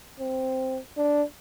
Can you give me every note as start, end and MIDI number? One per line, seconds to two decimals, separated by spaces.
0.20 0.78 60
0.97 1.23 62